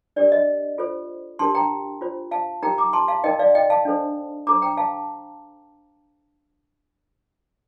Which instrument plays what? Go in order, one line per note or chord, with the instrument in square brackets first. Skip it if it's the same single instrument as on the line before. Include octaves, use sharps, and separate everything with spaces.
[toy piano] D4 G4 A#4 D5
D#5
F4 A4 C5
D4 G4 A#4 A5 C6
G5 A#5
F4 C5
F5 A5
D#4 G4 A#4 G5 A#5
A#5 D6
A5 C6
F5 A5
D#4 A#4 D#5 G5
D5 F5
D#5 G5
F5 A5
D4 A4 C5
D4 A4 C5 A#5 D6
G5 A#5
F5 A5